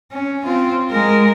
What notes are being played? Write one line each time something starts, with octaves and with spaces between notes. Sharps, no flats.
C#4
C4 F4
G#3 A#4